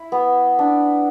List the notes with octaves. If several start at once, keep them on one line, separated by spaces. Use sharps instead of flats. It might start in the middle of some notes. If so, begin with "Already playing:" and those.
Already playing: E4
B3
D4